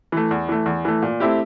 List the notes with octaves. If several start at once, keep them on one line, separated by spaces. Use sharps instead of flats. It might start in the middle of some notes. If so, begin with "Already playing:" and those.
E3 A3
E2
E3 A3
E2
E3 A3
A#2
A3 C4 E4 G4